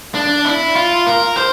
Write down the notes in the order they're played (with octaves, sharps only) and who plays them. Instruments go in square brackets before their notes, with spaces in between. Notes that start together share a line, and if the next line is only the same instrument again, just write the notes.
[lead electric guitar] D4
E4
F4
A#4
C5